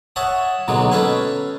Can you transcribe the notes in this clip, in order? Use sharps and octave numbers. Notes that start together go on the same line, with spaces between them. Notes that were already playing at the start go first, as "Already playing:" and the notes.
C#5 E5 F#5 A5 D#6
B1 B2 D3 F#3 G#3 A#3
C#4 A4 B4 F5 G#5